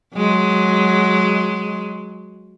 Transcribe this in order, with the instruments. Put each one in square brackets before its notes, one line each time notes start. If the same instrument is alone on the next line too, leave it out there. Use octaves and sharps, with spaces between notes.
[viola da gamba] F#3 G#3